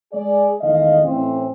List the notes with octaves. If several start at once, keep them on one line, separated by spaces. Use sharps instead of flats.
G#3 G#4 D5
E2 D#3 G#3 A3 D#5 F5
A2 E3 C4 C#4